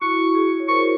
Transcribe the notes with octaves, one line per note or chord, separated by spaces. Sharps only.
E4 F#4 C#6
F#4 G#4
C#5
A#4 C5 C#6